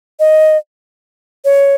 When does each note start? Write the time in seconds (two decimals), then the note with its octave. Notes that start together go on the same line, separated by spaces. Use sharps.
0.19 D#5
1.45 C#5